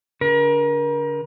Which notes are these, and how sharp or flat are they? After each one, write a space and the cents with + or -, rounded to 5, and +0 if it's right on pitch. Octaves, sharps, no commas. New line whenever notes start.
D3 -35 A#4 +35